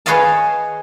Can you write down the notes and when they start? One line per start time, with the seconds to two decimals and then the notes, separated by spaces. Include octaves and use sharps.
0.06 G#4 B4 C#5 D#5 F5 A5